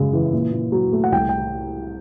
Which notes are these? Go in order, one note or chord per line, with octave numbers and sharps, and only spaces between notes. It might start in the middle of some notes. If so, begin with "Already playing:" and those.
Already playing: F#2 C#3 G#3
E3
A#2
A#2
F#3
A3
F#5
C2 G5
G5